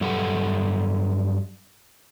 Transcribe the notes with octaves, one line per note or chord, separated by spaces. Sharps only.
G2 F#3 G4 A4 F#5